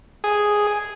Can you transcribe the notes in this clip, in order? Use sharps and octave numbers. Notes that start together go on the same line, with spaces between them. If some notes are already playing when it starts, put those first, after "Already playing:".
G#4